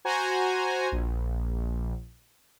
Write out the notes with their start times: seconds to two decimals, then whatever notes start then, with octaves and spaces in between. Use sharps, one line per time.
0.05 F#4 C5 G#5 A#5
0.92 A#1